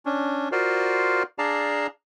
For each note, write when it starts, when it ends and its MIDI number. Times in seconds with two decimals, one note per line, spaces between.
0.05 0.49 61
0.05 0.49 62
0.52 1.23 65
0.52 1.23 66
0.52 1.23 70
0.52 1.23 72
0.52 1.23 74
0.52 1.23 77
1.38 1.87 62
1.38 1.87 68
1.38 1.87 74
1.38 1.87 77
1.38 1.87 81
1.38 1.87 82